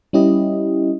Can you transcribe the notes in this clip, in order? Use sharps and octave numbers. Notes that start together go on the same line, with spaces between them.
G3 C#4 E4 G4 D#5